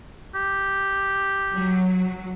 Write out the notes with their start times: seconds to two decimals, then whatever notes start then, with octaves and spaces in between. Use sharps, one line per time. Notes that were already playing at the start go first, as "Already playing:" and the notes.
0.35 G4
1.53 F#3